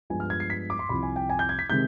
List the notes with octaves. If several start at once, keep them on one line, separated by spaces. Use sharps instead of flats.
G2 F3 G#3 B3 G#5
F6
G#6
C7
B6
D6
C6
C2 C3 F3 B5
G#5
G5
G#5
G6
G#6
B6
C3 D#3 G#3 G6